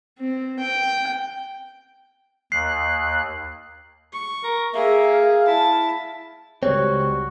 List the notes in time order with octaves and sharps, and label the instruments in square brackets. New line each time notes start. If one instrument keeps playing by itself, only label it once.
[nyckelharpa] C4
G5
[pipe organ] D#2 F#6 [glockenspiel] C7
[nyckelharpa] C#6
[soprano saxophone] A#4
[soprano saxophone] A#3 [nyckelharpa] G#4 [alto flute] E5
[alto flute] F5
[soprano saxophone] E4 [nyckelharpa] A5
[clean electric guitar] C#2 G3 C4 [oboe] F#4 [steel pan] C#5